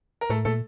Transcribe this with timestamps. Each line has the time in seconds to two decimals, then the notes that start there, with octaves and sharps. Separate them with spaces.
0.21 A#4
0.30 A2 A3 A4
0.45 A#2 A3 A4